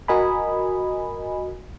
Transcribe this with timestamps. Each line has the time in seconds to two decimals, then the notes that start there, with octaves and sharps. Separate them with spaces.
0.08 F#4 A#4 D#5 G#5 B5